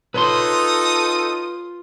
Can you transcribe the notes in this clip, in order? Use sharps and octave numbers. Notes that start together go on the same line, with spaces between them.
D#4 F4 A4 B4 C#5 C6 D#6